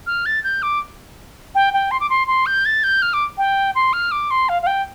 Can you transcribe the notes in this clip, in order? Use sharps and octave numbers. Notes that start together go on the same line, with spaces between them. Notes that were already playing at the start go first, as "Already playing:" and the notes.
F6
A6
G6
D6
G5
G5
C6
D6
C6
C6
G6
A6
G6
F6
D6
G5
C6
F6
D6
C6
F5
F5
G5